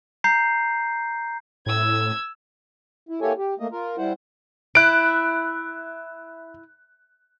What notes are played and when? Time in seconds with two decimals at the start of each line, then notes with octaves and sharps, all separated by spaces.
0.24 A#5 G6 C7
1.66 A2 E6 G#6
3.09 E4
3.21 A#3 E4 G4 A4 C#5 G#5
3.38 G4
3.60 A3 A#3 D#5
3.72 F4 A#4
3.98 G3 E4 C5 F#5
4.75 E4 F#6 D7